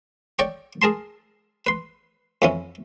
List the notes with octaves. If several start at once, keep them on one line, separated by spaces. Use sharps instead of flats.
C#5 D5 G5 C#6
G#4 A#4 A5 C6
B4 C6
F2 E3 C#4